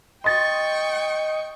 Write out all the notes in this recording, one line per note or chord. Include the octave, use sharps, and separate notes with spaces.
D#5 G5 C6 C#6 A6